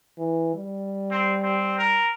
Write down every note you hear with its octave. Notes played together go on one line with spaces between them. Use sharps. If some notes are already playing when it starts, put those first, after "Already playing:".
E3
G3
C4
C4
A#4